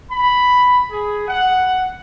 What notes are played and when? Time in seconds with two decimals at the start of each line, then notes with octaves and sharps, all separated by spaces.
0.11 B5
0.91 G#4
1.28 F#5